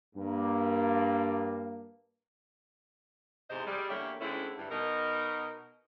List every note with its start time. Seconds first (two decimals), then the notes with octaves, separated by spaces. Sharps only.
0.16 G2 A#3
3.50 E2 G#2 C3 C5 D#5
3.66 G3 G#3
3.89 E2 D3 A#3 G4 C#5 E5
4.21 D3 G#3 A3 C4 C#4 E4
4.58 G2 E3
4.71 B2 D#4 A#4